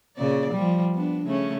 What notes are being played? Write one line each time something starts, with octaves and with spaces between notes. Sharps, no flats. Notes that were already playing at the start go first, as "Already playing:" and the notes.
A#2 C#3 D5
F3 G3
B3 D4
C#3 A3 C#4